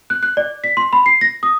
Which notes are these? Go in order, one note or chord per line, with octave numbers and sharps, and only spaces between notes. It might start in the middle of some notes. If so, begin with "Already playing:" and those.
F#6
F#6
D5
B6
C6
B5
C7
A#6
D#6